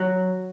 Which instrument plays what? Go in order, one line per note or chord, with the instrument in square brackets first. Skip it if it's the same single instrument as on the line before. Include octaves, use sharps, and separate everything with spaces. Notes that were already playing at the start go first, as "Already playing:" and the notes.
Already playing: [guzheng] F#3